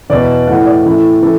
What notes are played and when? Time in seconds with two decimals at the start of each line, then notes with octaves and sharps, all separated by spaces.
0.10 E2 B2 D5
0.47 A2 E3 F#5
0.66 D5
0.86 A2 E3
1.23 E3 A4